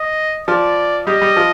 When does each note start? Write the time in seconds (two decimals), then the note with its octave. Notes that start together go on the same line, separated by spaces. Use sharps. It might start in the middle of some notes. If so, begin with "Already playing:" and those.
Already playing: D#5
0.48 F3 F4 D5
1.07 G3 G4 D#5
1.21 G3 G4
1.36 F3 F4